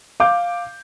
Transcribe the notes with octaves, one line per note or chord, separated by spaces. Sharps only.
F5 D6 G6